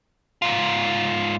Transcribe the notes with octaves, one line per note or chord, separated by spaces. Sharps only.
G#2 F4